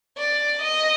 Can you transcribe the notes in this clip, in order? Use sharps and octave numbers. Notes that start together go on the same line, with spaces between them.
D5
D#5